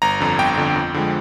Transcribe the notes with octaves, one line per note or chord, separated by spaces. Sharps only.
G1 A#5
F2 D3
G1 G5
F2 D3
F2
D3 F3 G#3